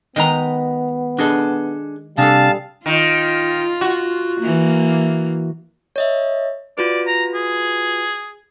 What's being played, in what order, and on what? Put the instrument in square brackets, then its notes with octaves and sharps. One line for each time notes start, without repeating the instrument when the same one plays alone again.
[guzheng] D#3 G#3 B4 [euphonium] B3 [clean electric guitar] D#5 A#5
[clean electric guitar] D4 G#4 A4 [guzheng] D#5
[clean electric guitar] C3 D4 [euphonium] G3 [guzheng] G#4 A4 [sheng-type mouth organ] F5 A5
[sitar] D#3 [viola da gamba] F4
[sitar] F#4
[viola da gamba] E3 A#3
[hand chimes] C#5 D#5 E5
[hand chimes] F4 F#4 B4 [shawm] D5
[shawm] A#5
G#4